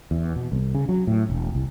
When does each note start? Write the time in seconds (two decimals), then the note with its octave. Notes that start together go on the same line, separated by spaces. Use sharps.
0.11 E2
0.36 B2
0.52 C2
0.75 C#3
0.89 F#3
1.07 A2
1.30 E1
1.55 C2